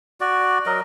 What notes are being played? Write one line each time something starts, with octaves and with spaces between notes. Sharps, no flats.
F#4 D5
F#3 A#4 D#5